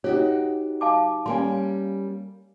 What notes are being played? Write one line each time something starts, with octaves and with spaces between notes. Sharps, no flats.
D#4 F#4 G4 C#5
F5 A5 D6
G3 A#3 C#4 G#5 C6